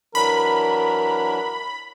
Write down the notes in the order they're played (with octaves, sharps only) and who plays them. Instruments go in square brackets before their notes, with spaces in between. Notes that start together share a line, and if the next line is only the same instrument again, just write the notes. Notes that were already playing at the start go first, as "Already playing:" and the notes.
[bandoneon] E3 F#3 D4 [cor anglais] A#4 [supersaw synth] B5